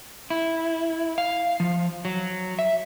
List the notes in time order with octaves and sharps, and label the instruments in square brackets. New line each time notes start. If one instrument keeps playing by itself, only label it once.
[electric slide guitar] E4
F5
F3
F#3
E5